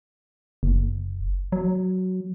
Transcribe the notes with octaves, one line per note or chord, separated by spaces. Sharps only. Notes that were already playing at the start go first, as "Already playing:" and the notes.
F#1
F#3